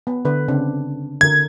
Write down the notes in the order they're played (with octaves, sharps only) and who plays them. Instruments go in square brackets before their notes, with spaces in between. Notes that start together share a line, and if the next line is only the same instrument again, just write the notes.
[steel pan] B3
D3 B4
C#3 C4 D4
[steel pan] D3 A#4 [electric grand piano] G#6